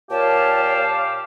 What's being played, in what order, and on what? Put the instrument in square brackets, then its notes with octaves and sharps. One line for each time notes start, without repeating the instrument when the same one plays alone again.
[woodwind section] A#2 A5 [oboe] G4 [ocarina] C#5 [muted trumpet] F5